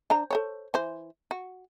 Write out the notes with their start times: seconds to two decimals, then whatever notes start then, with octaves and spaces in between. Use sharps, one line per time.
0.10 D4 C5 A#5
0.31 A4 C5 C#5
0.74 E3 C5
1.31 F#4